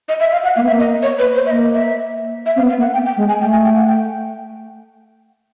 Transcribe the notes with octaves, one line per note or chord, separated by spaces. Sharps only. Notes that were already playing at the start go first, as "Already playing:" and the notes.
D#5
E5
F5
F#5
A#3 F5
B3
E5
A#3
D#5
C#5
B4
C5
E5
A#3 D#5
E5
E5
C4 F5
B3
F5
A#3
F#5
G5
G5
G#3
G#5
A3 G5
G#5
G5
F#5
G5